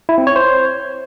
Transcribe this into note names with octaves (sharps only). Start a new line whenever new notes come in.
E4
C4
C#5
C5